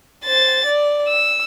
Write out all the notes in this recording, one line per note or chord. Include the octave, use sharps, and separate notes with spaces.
C5 A6
D5
E6